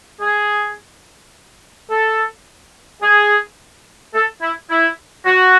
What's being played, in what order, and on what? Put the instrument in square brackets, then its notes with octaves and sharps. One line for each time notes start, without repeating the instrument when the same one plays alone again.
[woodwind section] G#4
A4
G#4
A4
E4
E4
F#4